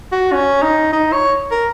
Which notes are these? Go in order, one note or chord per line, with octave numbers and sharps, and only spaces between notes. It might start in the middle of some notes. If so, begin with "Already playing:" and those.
F#4
C#4
D#4
D#4
C#5
A#4